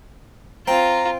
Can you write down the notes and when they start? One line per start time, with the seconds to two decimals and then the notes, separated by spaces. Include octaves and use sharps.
0.68 C4 F4 A#5